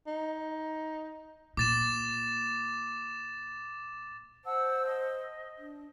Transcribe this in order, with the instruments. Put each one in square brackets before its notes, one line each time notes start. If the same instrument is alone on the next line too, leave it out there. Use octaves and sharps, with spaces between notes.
[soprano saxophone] D#4
[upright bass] A#2 [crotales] D6 A6 E7
[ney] C5 [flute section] F#5 A5 E6
[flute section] D#5
[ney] D4